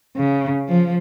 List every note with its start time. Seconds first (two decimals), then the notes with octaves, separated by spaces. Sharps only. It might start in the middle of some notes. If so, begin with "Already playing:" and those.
0.17 C#3
0.68 F3